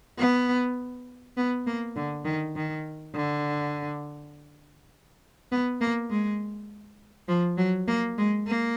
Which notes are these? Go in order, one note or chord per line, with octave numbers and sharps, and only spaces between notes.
B3
B3
A#3
D3
D#3
D#3
D3
B3
A#3
G#3
F3
F#3
A#3
G#3
A#3